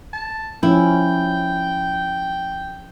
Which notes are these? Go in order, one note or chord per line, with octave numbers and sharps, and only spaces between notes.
A5
F3 C#4 E4 G5